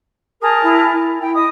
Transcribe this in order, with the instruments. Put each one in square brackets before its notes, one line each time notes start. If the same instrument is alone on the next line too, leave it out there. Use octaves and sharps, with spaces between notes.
[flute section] G#4 A#4 A5 [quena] D#6
[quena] E4
E4
[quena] E4 [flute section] G5
[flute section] D#5 D#6